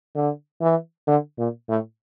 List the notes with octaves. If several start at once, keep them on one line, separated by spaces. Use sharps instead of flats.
D3
E3
D3
A#2
A2